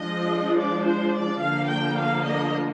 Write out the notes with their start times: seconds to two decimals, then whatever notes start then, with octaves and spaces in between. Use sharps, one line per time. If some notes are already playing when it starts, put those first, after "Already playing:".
Already playing: F3 G#3 D4 D#5
0.59 D5
0.87 C5
1.15 D5
1.42 D3 F3 A#3 F5
1.71 G5
1.98 F5
2.27 D#5